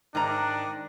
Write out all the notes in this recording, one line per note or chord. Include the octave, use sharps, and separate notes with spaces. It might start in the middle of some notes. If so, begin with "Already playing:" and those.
G#2 D#3 D4 A#5